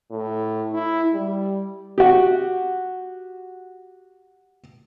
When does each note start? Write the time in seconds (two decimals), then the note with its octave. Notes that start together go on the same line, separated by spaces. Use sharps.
0.11 A2
0.72 E4
1.14 G3
1.98 F#4 G4